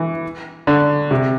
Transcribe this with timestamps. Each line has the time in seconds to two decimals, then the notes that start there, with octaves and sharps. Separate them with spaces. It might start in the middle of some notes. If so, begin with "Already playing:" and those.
Already playing: E3
0.67 D3
1.11 C3